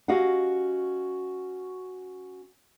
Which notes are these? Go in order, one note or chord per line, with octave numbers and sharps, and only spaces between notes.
C#4 F#4 G4 D#5 F5 F#5